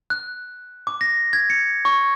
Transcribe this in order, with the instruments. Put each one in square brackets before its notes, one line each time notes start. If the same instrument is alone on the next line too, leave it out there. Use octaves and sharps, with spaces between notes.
[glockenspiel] F#6
D6
A#6
G#6
C#7
C#6